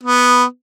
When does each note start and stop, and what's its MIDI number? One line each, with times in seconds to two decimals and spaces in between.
0.03 0.44 59